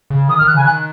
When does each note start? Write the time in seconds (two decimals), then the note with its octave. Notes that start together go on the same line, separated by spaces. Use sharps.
0.10 C#3
0.29 D#3 D#6
0.39 F6
0.41 D#3
0.47 F#6
0.54 C#3 G#5
0.65 D#3 F#6